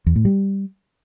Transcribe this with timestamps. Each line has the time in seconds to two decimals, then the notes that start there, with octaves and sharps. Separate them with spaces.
0.06 E2
0.16 A2
0.25 G3